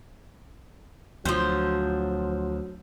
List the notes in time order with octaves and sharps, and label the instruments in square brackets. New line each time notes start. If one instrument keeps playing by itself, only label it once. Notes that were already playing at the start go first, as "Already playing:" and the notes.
[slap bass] D2 [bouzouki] F3 C5 [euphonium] F#3